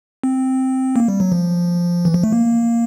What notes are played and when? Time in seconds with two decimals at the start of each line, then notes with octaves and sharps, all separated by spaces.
0.24 C4
0.96 A#3
1.08 G3
1.20 F#3
1.32 F3
2.05 E3
2.14 F3
2.23 A3
2.32 A#3